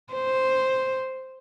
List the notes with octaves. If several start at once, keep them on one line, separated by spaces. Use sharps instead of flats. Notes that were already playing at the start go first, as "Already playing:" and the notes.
C5